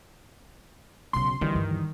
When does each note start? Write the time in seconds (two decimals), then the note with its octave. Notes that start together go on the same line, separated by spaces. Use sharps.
1.13 B1 C#3 C6
1.41 D2 D#3 E3 G3 D4
1.55 G2